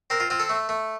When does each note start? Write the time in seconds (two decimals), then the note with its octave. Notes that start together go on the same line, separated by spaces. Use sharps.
0.10 C4 A#4
0.20 F4
0.30 C4 F4
0.40 A4
0.49 A3
0.69 A3